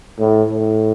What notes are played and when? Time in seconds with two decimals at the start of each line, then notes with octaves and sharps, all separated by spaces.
0.19 A2
0.52 A2